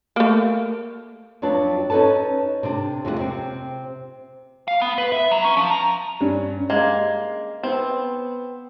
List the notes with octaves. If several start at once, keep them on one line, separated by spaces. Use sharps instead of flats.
A3 A#3
F2 F#3 D4 B4 A5
C#4 D#4 A4 B4 A5
C3 D4
F2 G#3 F4 F#5
C3 C4
F5
B3
B4
E5
F#3
C#4
F3
A#5
G2 C#4 D4
G#3 A#3 F5
B3 C4